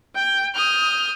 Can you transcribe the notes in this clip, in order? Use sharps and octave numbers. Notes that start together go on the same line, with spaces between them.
G5
D#6 F6 G6